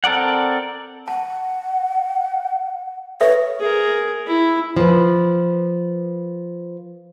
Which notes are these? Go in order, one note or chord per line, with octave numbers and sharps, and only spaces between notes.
C4 A4 A#4 D5 F#5
F#5 A5
A4 B4 C#5 E5
G#4 A#4
E4
F3 B4